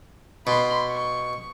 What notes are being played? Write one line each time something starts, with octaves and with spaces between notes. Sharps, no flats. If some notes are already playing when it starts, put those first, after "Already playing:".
B2 B5 C6
C#6